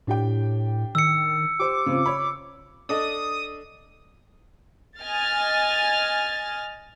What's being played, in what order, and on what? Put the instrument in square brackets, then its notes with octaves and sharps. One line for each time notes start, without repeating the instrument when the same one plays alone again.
[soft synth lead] A2 [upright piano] D4 G4 G5
[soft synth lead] D#3 [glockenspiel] E6 C#7
[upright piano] G4 C5 [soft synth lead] D6
[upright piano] C#3 C4 F4
C#5 B5
[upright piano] D4 A4 D#5 [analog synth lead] D#6
[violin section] D#5 G#5 F6 A6